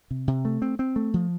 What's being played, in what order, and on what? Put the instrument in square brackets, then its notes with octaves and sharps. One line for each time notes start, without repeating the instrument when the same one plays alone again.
[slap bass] C3
C3
A3
C4
C4
A3
F3